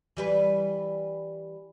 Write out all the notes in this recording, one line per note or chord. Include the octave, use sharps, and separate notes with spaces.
E3 G3 B4